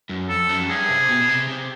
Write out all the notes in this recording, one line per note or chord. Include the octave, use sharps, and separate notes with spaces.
F#2
F2 A4
F#2
G2 G#4
C3
B2
B2
C3
C3